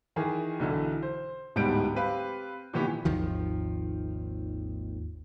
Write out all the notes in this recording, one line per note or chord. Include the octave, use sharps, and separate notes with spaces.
D#3 E3 G#4 A#4
B1 D3 E3 A4
C5
D1 G#2 G3 B3 G6 D7
C4 G4 B4 F5
A#2 D#3 E3 B3 G4
G#1 D#2 D#3 F3